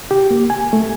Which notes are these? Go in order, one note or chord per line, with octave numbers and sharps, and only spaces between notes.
G4
A#3
G#5
A3